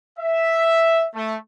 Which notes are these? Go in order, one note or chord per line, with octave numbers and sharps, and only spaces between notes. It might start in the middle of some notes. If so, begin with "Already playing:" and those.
E5
A3